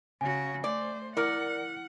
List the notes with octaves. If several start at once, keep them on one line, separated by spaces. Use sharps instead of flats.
C#3 F#4 G#5
A3 C5 D5
E4 A#4 D5 F#5 F6 C#7